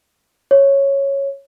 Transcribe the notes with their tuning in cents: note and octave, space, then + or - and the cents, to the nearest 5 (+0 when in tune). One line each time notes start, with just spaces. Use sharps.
C#5 -5